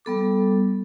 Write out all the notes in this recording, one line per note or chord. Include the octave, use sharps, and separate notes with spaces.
G3 B3 A4 D6